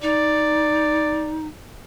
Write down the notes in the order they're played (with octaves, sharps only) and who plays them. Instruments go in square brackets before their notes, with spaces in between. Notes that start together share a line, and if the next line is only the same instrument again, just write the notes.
[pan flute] D#4 [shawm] D5